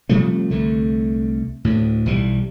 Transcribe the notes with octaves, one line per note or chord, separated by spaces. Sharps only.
C3 F3 G3 A3
C2 D3 A3
D2 A2
B1 E3 G3